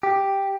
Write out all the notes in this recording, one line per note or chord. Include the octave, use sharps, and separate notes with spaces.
G4